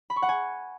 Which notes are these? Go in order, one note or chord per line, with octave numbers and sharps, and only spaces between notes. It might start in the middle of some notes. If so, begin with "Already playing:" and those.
B5
C#6
F#5
G#5